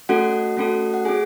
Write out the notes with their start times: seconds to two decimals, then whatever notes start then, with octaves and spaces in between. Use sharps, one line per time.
0.09 A3 C#4 F#4 A4 F#5
0.57 A3 C#4 F#4 A4
0.94 F#5
1.05 C#4 G#4 G#5